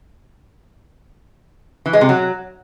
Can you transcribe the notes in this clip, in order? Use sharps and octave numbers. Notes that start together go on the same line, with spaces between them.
E3
G#3
C3
F#3